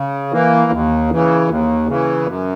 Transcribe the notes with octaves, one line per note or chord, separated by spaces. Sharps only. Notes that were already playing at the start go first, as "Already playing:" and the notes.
Already playing: C#3
E3 A#3
D#2
C#3 E3
D#2
C#3 E3
F#2